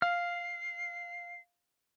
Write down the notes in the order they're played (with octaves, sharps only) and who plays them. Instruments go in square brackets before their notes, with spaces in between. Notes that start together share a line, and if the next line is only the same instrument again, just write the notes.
[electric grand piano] F5 [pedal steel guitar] F6 [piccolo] C7